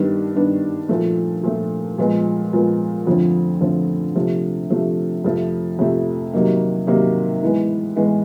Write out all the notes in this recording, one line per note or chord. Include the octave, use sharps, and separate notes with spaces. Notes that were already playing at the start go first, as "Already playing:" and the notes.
Already playing: G2 D#3 G3 B3 D4
G2 D#3 G3 B3 D4
A#2 F3 A3
A#2 F3 A3
A#2 F3 G#3 B3
A#2 F3 G#3 B3
F2 D3 F3 A3 C4
F2 D3 F3 A3 C4
C3 F3 A3
C3 F3 A3
F2 C3 F3 A3
F2 C3 F3 A3
C3 D#3 F#3 A#3 D#4
C3 D#3 F#3 A#3 D#4
A2 E3 G#3 B3
A2 E3 G#3 B3